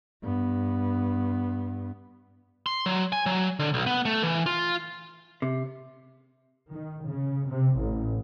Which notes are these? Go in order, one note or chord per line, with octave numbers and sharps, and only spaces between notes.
G2 B3
C6
F#3
G#5
F#3
D3
B1
B3
A3
E3
F4
C3
D#3
C#3
C3
A1